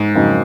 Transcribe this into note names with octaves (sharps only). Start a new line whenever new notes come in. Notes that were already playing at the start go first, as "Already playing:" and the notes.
Already playing: G#2
F2 C#3 F#3 A#3 D#4